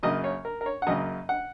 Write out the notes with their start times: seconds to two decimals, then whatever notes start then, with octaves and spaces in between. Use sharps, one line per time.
0.03 F#2 C#3 A#3 D#5
0.24 C#5
0.45 A#4
0.61 A#4
0.66 C#5
0.82 F#5
0.87 F#2 C#3 A#3 D#5
1.29 F#5